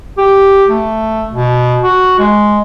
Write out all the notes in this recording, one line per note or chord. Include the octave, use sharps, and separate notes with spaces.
G4
A3
B2
F#4
G#3